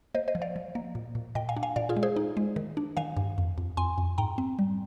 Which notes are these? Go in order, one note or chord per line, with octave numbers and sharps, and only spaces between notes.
A#3 C5 D#5
C5 D#5
F3
D5 F5
F3
A#3
A#2
A#2
A#2 D#5 G5
F5 G#5
D4
F5 G#5
A#2 D5 F5
F4 G#4
G#3
G#4 C5
D#4
G#3
D#3
D4
D#3 F5 G#5
G2
F2
F2
F2 G#5 C6
F2
G#2 G5 A#5
C4
G3